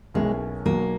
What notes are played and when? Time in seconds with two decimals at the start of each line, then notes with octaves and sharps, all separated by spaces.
0.14 B1 B2 G#3 A#3 C#4 E4
0.66 B1 B2 F#3 A#3